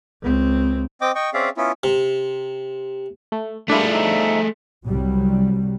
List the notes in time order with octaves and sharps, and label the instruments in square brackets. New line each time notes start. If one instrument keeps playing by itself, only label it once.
[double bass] C#2 C4
[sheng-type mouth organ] C4 D#5 G5 D6
D#5 G5 C#6
C4 C#4 G#4 D5 E5 F5
B3 C#4 E4 F4
[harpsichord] C3
[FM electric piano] A3
[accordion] G3 A#3 [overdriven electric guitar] A3 G#4 [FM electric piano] D4 E4 F4
[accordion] F3 D#4 E5
[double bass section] C2 F#3 G3